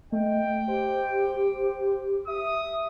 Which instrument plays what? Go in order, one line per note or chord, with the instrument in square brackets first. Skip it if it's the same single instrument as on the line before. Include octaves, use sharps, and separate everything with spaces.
[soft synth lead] A3 [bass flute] D#5 [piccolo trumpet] G5
[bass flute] G4 [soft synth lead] C5
[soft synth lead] E5 [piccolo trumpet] D#6